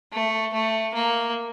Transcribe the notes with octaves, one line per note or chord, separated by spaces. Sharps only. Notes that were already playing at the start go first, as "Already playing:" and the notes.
A3
A3
A#3